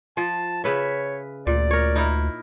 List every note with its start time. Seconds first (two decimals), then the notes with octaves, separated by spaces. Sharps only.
0.17 F3 A5
0.64 C#3 B4 C#5 E5
1.47 D2 A#2 D5
1.71 A#4 C#5
1.95 D#4 E4 A#4